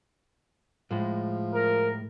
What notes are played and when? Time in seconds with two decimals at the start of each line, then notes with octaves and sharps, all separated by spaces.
0.91 A2 F3 G#3
1.54 A#4